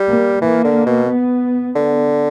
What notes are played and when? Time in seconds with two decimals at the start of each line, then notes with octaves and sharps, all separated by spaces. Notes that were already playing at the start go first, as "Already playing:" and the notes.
Already playing: G3
0.08 A#3
0.42 E3 A#3
0.65 D3
0.86 B2
1.09 B3
1.75 D3 B3